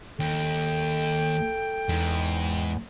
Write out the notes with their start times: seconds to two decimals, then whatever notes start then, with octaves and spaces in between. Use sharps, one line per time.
0.19 D#2 A4 G5
1.89 E2 G#2